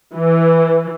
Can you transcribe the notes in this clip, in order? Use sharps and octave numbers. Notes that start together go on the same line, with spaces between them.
E3